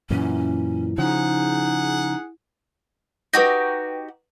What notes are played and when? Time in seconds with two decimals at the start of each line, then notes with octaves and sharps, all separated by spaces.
0.10 F#2 A#2 E3 C#4 E4
0.98 C#3 F3 D#4 G#4 F#5
3.33 D#4 F#4 G4 B4 A#6